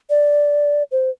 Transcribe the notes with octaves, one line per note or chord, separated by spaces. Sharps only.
D5
C5